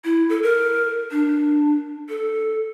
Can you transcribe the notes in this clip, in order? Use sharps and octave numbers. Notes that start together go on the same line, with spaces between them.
E4
A4
A#4
D4
A4